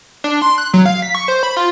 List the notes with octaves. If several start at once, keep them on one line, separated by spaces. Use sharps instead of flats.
D4
C6
F#6
F#3
F5
B6
C#6
C5
B5
F4